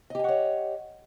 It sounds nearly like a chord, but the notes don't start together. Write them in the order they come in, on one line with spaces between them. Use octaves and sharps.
D#5 G4 G#5 F#5 C#5